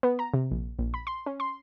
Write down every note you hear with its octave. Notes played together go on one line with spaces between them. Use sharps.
B3
A#5
C3
A#1
A#1
B5
C6
C#4
C6